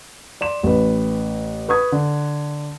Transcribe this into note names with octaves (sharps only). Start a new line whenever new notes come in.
D5 C6 E7
A1 B4
B4 C#6 D#6 G#6
D3